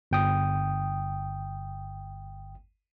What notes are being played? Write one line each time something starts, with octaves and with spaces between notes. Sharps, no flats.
G1 G5 D#6